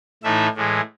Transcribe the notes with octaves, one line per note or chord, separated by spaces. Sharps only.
A2 E3 A3 D#4 E5
A2 E3 G#3